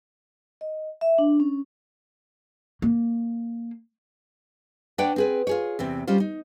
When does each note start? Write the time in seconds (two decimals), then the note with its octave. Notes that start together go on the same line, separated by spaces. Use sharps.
0.61 D#5
1.01 E5
1.18 D4
1.40 C#4
2.82 A#3
4.98 D4 B4 C#5 D5 F#5 G5
5.16 C4 G#4 B4
5.47 F4 G#4 C#5
5.79 E2 C3 C4
6.07 G3 C#4 F4 C5
6.20 D#4